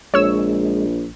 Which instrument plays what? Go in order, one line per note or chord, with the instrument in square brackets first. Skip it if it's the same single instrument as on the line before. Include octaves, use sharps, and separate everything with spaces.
[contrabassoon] A#1 [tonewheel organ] G#3 [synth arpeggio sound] C#5 E6